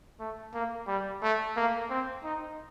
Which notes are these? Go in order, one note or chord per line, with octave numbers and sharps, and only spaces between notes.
A3
A#3
G3
A3
A#3
C4
D#4